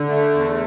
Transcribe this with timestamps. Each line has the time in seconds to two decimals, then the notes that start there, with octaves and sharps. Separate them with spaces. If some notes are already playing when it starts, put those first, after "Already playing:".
Already playing: D3
0.09 A3
0.34 E2